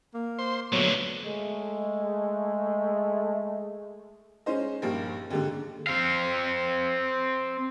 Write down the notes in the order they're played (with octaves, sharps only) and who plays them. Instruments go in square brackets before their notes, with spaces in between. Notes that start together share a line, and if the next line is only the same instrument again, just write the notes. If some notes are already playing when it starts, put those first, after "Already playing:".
[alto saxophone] A#3
[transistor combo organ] C5 C6
[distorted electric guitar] A#2 D3 [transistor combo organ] F#3 A3 B3 [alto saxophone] C#5
[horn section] G#3 A3
[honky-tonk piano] G#3 C#4 D#4 C5 D#5
A#1 G2 A#3
D#2 G#2 D3
[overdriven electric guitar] C4 F5